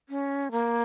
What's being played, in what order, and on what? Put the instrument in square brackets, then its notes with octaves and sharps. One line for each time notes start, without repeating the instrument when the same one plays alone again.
[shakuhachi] C#4
A#3